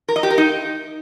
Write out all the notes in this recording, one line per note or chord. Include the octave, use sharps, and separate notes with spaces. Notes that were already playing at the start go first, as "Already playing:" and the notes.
A#4
D#5
G4
A#4
D#4